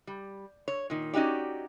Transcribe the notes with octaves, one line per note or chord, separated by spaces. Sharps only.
G3
C#5
A#2 D#3
C#4 D#4 F#4 G4 D5